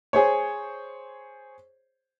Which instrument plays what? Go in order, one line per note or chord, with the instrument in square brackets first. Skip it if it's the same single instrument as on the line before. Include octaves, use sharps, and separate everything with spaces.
[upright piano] G#4 C5 C#5